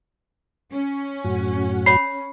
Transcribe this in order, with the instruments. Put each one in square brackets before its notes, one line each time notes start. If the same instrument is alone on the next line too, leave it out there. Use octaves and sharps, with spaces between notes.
[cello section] C#4
[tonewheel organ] F#2 A2 F#4
[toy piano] C#5 B5 [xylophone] C7